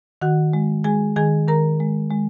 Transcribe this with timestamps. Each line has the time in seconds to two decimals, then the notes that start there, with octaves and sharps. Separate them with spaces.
0.21 D#3 F#4 F#5
0.53 G#3
0.84 G#3 G#4 G#5
1.16 D#3 G#4 G#5
1.48 D#3 A#4 A#5
1.80 G#3
2.11 G#3